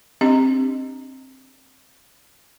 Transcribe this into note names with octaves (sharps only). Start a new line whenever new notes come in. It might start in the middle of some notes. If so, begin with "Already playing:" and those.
C4 D4 G4 D#5